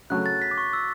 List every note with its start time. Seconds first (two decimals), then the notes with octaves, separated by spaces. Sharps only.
0.10 C#3 F#3 A3 F#6
0.26 A6
0.42 B6
0.51 D6
0.58 C#6
0.73 E6